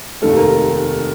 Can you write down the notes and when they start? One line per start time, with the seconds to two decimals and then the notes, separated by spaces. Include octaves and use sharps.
0.22 F1 D#2 D#3 A3 A4
0.37 A#4